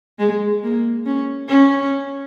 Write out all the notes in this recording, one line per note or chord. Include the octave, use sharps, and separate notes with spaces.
G#3
A#3
C#4
C#4